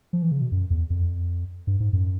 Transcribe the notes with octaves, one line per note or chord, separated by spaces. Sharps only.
F3
E3
C#3
B2
F#2
E2
F2
G2
G#2
F#2